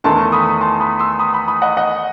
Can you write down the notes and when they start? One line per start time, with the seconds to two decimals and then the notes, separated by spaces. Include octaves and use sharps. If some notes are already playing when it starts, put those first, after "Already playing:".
0.04 E2 D#3 A3 A5 C6
0.32 B5 D#6
0.61 A5 C6
0.80 B5 D#6
0.99 C6 E6
1.19 B5 D#6
1.33 B5 D#6
1.48 B5 D#6
1.62 D#5 F#5
1.77 D#5 F#5